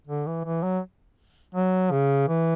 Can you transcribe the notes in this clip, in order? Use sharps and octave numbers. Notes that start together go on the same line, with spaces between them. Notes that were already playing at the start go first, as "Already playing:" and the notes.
D3
E3
E3
F#3
F#3
C#3
E3